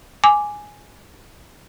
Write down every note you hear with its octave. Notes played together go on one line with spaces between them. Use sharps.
G#5 D6